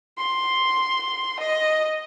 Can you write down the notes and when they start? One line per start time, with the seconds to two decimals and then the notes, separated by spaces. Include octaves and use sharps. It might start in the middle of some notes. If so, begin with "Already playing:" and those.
0.18 C6
1.40 D#5